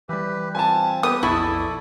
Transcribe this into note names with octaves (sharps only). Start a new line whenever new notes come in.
E3 G3 G4 B4
C4 F4 G#5 A5
B3 G4 D#6
B1 F2 E4 G#4 G#5 A5 C#6
A4 D5 A5